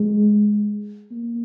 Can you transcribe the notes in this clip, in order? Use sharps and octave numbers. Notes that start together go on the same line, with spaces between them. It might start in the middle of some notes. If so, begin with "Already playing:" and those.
Already playing: G#3
A#3